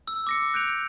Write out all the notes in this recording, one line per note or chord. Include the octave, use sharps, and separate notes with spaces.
E6
D6 A#6 C#7
F#6 G6 D7 F7